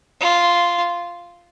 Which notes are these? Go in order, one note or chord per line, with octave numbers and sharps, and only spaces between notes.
F4